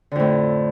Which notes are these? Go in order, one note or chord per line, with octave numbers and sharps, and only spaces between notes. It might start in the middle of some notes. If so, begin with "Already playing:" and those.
F2 A2 D3